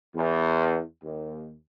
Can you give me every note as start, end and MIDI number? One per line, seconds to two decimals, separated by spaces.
0.14 0.81 40
1.02 1.53 39